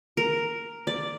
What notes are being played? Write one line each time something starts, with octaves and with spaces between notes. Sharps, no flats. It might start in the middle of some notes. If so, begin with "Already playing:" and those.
A#4
D5